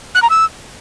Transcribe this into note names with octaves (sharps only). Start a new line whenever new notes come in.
F#6
A#5
E6